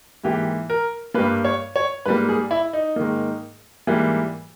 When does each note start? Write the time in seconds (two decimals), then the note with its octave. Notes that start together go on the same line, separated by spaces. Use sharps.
0.24 G#2 E3 A#3 G4
0.70 A#4
1.14 G2 G3 A#3 B4
1.45 C#5
1.76 C#5
2.06 G#2 G3 A#3 B4
2.29 G#4
2.51 E4
2.73 D#4
2.96 G#2 D#3 A#3
3.87 G#2 E3 G3 A#3